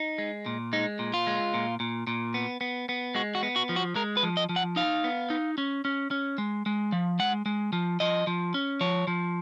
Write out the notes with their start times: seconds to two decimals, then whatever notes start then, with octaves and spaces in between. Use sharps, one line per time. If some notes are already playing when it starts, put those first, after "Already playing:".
Already playing: D#4
0.18 G#3
0.46 A#2
0.73 G#3 D#4
0.99 A#2
1.14 F4
1.27 G#3
1.54 A#2
1.80 A#2
2.07 A#2
2.34 B3
2.61 B3
2.89 B3
3.15 G#3 F#4
3.35 F#4
3.43 B3
3.56 F#4
3.69 F3
3.76 F#4
3.96 G#3 A#4
4.17 B4
4.23 F3
4.37 D#5
4.49 F3
4.56 F#5
4.76 D#4 F5
5.04 B3
5.30 D#4
5.58 C#4
5.85 C#4
6.11 C#4
6.38 G#3
6.66 G#3
6.92 F3
7.19 G#3 F#5
7.46 G#3
7.73 F3
8.00 F3 D#5
8.27 F3
8.54 C#4
8.81 F3 C#5
9.07 F3